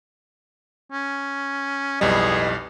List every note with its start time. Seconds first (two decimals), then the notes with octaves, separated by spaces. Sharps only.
0.92 C#4
2.01 B1 F2 A2 G3 G#4 B4 D#5